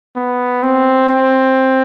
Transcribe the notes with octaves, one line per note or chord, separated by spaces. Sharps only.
B3
C4
C4